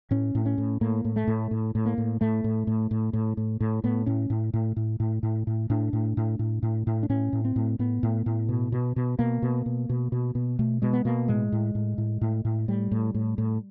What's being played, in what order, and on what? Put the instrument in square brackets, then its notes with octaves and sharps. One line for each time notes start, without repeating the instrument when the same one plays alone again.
[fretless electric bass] A2 C#4
A2
C#4
A2
A2 A#3
A2
A3
A2
A2
A2
A#3
A2
A2 A3
A2
A2
A2
A2
A2
A2
A2 B3
A2 C#4
A2
A2
A2
A2
A2
A2
A2 D4
A2
A2
A2
A2
A2
D4
A2 C#4
A2
C4
A2
A2 B3
A2
A2
B2
B2
B2
B2 A#3
B2
B2
B2
B2
B2
B2 A3
B2 G#3
B3
B2 A#3
A2 G#3
A2
A2
A2
A2
A2
A2 G3
A2
A2
A2